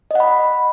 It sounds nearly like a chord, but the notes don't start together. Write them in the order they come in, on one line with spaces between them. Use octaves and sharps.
D#5 F#5 B5